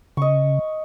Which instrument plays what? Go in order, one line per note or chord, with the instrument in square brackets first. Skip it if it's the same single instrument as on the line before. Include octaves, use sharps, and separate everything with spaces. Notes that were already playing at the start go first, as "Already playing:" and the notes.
[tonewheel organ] C#3 [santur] D#5 C#6